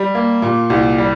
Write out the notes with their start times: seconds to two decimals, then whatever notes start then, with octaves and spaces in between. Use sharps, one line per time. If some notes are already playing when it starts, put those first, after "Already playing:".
Already playing: G3
0.15 A#3
0.42 A#2
0.70 C2
0.98 G3